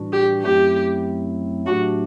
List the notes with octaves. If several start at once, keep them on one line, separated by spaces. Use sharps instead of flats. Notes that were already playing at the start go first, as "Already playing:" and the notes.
Already playing: A2 E3 G3 D4 F#4
G4
F#2 F#3 A3 C4 E4 G4
A2 F#3 A3 D4 F#4 G4